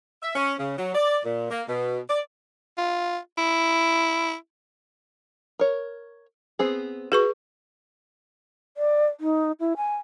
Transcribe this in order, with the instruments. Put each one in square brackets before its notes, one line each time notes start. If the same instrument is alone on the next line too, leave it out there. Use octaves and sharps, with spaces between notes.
[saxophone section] E5
C#4
C#3
F#3
D5
A#2
A#3
B2
D5
[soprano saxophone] F4
E4
[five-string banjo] A#4 C#5
B3 C4 G#4
[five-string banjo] F#4 [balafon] G#4 B4 C#6
[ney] D5
D#4
E4
G#5